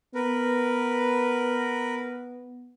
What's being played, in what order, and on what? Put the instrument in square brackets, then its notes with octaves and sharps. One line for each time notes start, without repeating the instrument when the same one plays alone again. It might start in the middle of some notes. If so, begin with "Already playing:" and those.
[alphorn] B3 [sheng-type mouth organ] A#4 B4